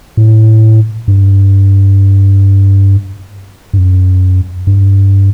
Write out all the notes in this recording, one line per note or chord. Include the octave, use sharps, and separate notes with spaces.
A2
G2
G2
F#2
G2